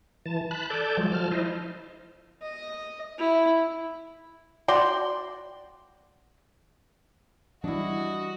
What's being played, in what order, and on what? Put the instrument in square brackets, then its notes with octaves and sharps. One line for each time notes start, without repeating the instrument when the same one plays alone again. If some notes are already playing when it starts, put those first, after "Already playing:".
[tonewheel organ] E3 A5
A5 B5 F#6
A4 D5 A5 G6
F3 F#3 G#3
F3 A5 F6
E4 C5 D#5
[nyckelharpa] D#5
E4
[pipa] F#4 D5 G5 C6
[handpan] E3 G3 [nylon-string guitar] D4 E4 [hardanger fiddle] F#4 [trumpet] D#5